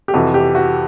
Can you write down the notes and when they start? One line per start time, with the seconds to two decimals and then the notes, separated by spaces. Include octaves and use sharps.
0.08 G4
0.14 F2 C3 E3 F#4
0.34 G4
0.55 F#4